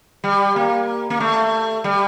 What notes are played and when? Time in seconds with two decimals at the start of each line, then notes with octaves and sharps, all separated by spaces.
0.24 G3
0.56 A#3
1.10 A#3
1.20 A3
1.84 G3